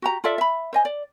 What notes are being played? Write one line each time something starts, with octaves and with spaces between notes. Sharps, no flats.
F#4 G4 A#5
F4 A4 D5 E5
E5 B5
C5 D#5 G#5
D5